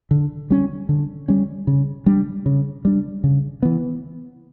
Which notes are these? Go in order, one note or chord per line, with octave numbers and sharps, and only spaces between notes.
D3
G3 C#4
D3
G3 C#4
C#3
G3 D4
C#3
G3 D4
C#3
E3 B3